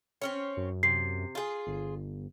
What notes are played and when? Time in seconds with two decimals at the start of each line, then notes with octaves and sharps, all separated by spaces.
0.22 C4 C#4 C#5
0.57 F#2
0.83 C3 C7
1.35 F4 G#4
1.67 G1